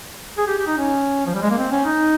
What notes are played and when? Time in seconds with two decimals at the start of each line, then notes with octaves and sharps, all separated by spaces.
0.38 G#4
0.47 G4
0.58 G4
0.67 D#4
0.77 C#4
1.26 F3
1.34 G3
1.42 G#3
1.50 A#3
1.58 C4
1.71 C#4
1.85 D#4